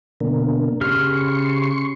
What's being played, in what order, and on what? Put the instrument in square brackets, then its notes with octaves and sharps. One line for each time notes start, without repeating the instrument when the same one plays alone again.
[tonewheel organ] B2 D3 A#3
[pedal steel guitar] C#3 G4 F6 [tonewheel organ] C6 C#6